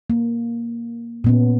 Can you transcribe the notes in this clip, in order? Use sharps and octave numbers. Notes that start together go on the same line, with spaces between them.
A#3
A#2 B3 C#4